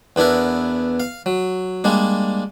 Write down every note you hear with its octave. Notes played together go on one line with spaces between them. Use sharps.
E2 B3 D4 E4 A#4
F5
F#3
G3 G#3 A#3 D4